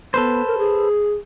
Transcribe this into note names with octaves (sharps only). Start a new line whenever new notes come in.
B3 A4 B4 C5
A#4
G#4